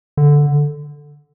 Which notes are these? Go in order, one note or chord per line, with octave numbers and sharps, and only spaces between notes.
D3